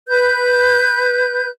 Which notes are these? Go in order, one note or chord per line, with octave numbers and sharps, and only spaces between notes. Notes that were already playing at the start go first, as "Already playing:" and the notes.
B4 G6